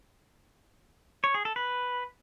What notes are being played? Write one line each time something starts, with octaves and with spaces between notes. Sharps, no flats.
C#5
G#4
A4
B4